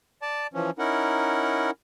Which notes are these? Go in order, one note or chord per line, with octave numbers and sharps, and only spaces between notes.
D5 A5
E3 F3 C#4
C#4 D#4 E4 A#4 F#5